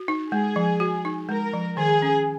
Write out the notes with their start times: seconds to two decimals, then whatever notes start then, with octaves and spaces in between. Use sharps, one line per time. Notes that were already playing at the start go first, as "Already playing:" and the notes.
Already playing: F#4
0.08 D#4
0.32 G#3 G#4
0.56 F3
0.80 F#4
1.05 D#4
1.29 G#3 A#4
1.53 F3
1.77 D#3 G#4
2.02 C#4